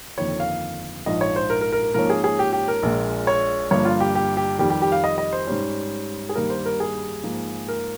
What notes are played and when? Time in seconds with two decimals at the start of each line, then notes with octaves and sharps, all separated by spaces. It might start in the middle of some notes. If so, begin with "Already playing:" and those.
0.17 G1 F2 D#3 A#3 C#5
0.40 F5
1.06 A#1 G#2 F3 D#5
1.21 C#5
1.36 C5
1.50 A#4
1.61 A#4
1.72 A#4
1.83 A#4
1.94 G#2 F3 A#3 C#4 A#4
2.10 G#4
2.24 G#4
2.39 G4
2.53 G4
2.68 A#4
2.83 A#1 A#2 G#3
3.27 C#5
3.71 G1 G2 F3 A#3 C#5
3.85 F4
4.00 G4
4.15 G4
4.37 G4
4.59 F2 D#3 G3 G4
4.70 G4
4.82 G4
4.92 F5
5.04 D#5
5.18 D#5
5.32 C5
5.47 G#2 G3 C#4
6.29 G#4
6.35 G2 D#3 G3 A#3 A#4
6.50 C5
6.65 A#4
6.80 G#4
7.24 G#2 F3 A#3 D#4
7.68 A#4